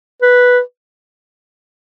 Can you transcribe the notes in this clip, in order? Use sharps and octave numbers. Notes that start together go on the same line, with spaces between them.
B4